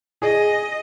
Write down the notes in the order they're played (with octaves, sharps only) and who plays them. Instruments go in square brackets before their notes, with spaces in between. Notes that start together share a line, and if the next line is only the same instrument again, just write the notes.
[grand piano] G#4 [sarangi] D#5